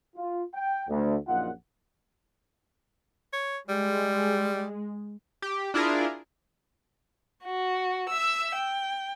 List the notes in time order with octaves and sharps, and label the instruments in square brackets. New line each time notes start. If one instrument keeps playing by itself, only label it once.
[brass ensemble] F4
G5
D2
A#1 F#2 A#2 D#4 F4 F#5
[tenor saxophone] C#5
[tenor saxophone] G3 [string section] G#3
[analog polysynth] G4
D4 E4 F4 G#4 A#4
[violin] F#4
E5 E6
G5